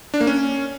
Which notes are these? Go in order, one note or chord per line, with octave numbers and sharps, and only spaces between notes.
D4
A#3
C#4